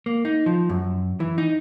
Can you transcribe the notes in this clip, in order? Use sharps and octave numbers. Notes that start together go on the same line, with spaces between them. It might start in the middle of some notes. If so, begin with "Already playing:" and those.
A#3
D#4
F3
F#2
E3
D#4